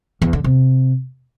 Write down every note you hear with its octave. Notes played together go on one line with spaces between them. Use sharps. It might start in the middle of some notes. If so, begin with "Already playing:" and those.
E2
D3
C3